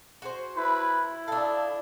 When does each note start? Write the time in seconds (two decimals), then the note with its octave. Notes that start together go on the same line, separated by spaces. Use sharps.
0.22 F#4 G#4 C5
0.57 E4 B4
1.28 D4 A4 F5